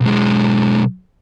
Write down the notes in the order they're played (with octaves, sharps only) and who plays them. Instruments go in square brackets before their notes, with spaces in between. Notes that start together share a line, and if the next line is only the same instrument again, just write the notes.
[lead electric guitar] B1 G#3